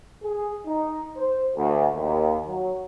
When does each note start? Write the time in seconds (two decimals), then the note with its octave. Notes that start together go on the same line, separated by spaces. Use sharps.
0.23 G#4
0.66 D#4
1.17 C5
1.55 D2
1.95 D#2
2.48 F#3